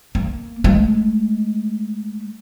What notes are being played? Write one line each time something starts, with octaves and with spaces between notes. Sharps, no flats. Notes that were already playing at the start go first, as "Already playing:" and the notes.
A#3
G#3 A3